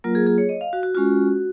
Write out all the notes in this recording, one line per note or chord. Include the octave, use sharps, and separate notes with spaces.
F#3 A#3 F4 A#4
G#4
G#4
C#5
D#5
F5
F#4
F#4
G#3 C#4 F4 F#4